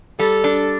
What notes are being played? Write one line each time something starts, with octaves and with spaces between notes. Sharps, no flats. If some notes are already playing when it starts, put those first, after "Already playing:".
G3 A4
D4